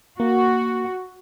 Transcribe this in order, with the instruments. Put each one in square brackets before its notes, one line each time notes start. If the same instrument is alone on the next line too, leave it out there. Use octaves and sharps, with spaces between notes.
[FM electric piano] A#3 [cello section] F#4